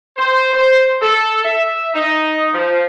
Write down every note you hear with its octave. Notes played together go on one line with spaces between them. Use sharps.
C5
C5
A4
E5
D#4
F3